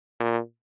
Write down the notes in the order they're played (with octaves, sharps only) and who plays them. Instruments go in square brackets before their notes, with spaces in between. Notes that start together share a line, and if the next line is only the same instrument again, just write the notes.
[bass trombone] A#2